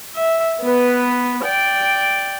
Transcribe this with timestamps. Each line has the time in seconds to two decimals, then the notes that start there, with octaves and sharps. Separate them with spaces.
0.15 E5
0.61 B3 B4
1.45 D5 G5